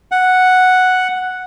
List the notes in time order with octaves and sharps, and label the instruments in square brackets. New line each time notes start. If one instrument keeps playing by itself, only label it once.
[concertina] F#5